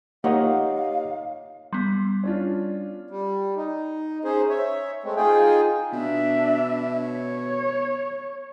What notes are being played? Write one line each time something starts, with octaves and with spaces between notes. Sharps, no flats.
A#3 D#4 G4 C#5 D#5 F5 F#5
G3 B3 C6
C#4 D4 F4
G3
D#4
C#4 D#4 G#4 C5
C#5 E5
G#3 A3 C4
D#4 F4 G#4 G5 G#5
B2 D4 E5
C#5